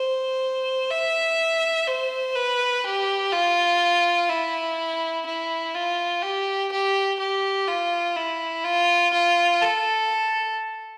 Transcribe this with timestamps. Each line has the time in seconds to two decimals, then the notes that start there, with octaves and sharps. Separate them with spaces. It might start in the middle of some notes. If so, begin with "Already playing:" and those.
Already playing: C5
0.91 E5
1.88 C5
2.36 B4
2.84 G4
3.32 F4
4.29 E4
5.26 E4
5.74 F4
6.22 G4
6.72 G4
7.19 G4
7.68 F4
8.16 E4
8.65 F4
9.13 F4
9.62 A4